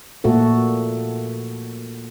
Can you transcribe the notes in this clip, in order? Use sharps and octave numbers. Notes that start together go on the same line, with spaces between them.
A#2 A3 F#4 A4